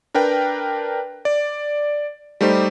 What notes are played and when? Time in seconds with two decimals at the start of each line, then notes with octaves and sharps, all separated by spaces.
0.14 D4 A#4 B4 G5
1.25 D5
2.41 G3 A3 D#4 G4 C5